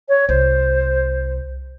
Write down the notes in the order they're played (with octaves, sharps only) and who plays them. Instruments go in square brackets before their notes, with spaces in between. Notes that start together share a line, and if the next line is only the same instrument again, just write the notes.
[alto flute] C#5
[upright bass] C2 [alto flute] C5